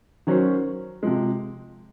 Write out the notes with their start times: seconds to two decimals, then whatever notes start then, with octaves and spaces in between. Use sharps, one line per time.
0.27 D#3 F#3 C#4 F#4 C5
1.03 C3 F3 G#3